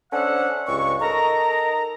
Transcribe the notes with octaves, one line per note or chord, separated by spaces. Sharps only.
C#4 D4 A4 C5 E5 F#5
C#2 G2 C#6
D#4 A4 A#4 D#5 A#5